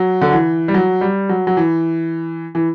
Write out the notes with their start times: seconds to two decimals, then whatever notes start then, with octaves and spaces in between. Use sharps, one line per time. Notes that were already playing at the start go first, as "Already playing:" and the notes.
Already playing: F#3
0.21 D3
0.32 E3
0.68 G3
0.74 F#3
1.01 G3
1.29 F#3
1.47 F#3
1.57 E3
2.55 E3